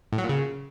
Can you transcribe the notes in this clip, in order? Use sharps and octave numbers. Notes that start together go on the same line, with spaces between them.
A2
F#3
A#2
C#3